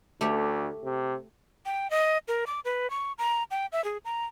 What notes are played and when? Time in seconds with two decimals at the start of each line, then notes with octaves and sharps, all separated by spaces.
0.21 D2 A3 G4 C#5
0.84 C3
1.66 G5
1.90 D#5
2.28 A#4
2.47 D6
2.65 B4
2.90 C#6
3.18 A#5
3.51 G5
3.72 E5
3.84 G#4
4.05 A#5